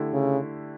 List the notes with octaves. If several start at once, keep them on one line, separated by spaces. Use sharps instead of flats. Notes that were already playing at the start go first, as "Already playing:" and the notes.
Already playing: D3 A3 E4 G4
C#3